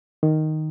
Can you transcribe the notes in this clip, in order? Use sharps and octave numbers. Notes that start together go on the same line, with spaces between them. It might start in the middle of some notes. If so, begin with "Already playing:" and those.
D#3